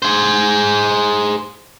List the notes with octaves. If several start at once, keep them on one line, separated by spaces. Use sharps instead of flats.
G#4 C5